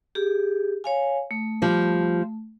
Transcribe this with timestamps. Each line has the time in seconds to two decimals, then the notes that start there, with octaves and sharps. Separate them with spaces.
0.15 G4 G#4
0.84 C#5 F5 G#5
1.31 A3
1.62 F3 G3